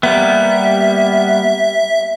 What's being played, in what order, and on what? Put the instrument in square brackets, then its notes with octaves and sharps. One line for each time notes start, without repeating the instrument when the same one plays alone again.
[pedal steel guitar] G3 A#3 B3 [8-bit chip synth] E5